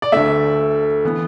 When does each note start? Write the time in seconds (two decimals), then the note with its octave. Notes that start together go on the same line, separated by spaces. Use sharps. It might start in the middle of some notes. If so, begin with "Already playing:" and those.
0.02 D5
0.12 D2 D3 A3 E5
1.05 E3 B3